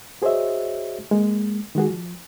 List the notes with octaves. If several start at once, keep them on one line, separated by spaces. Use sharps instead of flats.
F#4 G#4 C5 C#5 D#5 E5
G#3 A#3
D#3 G#3 F#4 G#4
F3